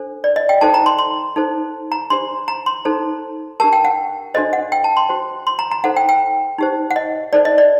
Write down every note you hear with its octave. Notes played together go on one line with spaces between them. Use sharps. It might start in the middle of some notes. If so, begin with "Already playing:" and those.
Already playing: D4 A4 C5
D5
D#5
G5
D#4 F#4 A4 C5 A5
A#5
C6
C6
D#4 A4 C5
A#5
D4 G4 C5 C6
A#5
C6
D#4 A4 C5
D4 G4 A#4 A5
G5
F#5
D4 F#4 A4 C5 D#5
F#5
G5
A5
C6
F#4 C5
C6
A#5
A#5
D#4 A4 C5 F#5
G5
G5
D#4 G4 C5
F#5
D#5
D#4 A4 C5 D5
D#5
D5